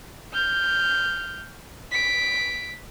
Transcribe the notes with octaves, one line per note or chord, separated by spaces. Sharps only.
F6 G6
B6 D7